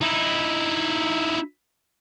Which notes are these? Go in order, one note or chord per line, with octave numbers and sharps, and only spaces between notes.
D#4 E4